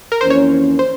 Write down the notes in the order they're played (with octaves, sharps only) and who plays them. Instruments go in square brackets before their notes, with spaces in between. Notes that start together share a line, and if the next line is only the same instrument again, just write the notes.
[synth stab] A#4
[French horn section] F2 E3 A#3 C#4 [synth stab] C5
[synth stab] C#5
C5